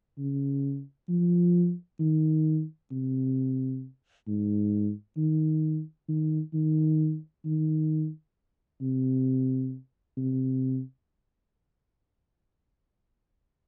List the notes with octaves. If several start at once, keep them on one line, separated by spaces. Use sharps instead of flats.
C#3
F3
D#3
C3
G#2
D#3
D#3
D#3
D#3
C3
C3